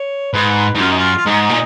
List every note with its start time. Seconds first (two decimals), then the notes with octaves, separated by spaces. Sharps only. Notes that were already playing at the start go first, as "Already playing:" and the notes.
Already playing: C#5
0.33 G#2 B4
0.75 G#2
0.80 F#2 F4
0.90 D#4
0.98 F4
1.17 F4
1.26 G#2 D#4
1.50 A#2